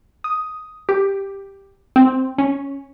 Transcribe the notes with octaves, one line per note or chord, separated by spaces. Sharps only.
D#6
G4
C4
C#4